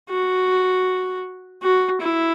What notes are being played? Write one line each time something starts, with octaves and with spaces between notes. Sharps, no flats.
F#4
F#4
E4